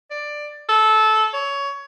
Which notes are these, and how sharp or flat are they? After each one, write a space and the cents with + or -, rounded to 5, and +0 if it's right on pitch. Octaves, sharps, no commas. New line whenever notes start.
D5 +10
A4 -15
C#5 +15